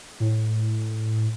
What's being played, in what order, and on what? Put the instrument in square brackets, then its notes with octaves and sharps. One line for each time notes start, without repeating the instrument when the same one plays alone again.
[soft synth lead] A2